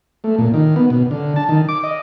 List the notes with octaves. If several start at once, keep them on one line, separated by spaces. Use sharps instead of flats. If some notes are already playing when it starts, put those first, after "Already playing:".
A3
A#2
D#3
B3
B2
D3
A5
D#3
D6
D#5